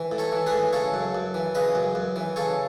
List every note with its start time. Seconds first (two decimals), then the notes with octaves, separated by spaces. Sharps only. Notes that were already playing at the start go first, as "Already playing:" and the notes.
Already playing: E3
0.11 A2
0.18 A4 C#5
0.32 E3
0.46 G#4 B4
0.52 A2
0.73 C#3 A4 C#5
0.94 F#2
1.15 F#2
1.34 E3
1.55 C#3 B4 D#5
1.75 F#2
1.95 F#2
2.16 E3
2.36 C#3 A4 C#5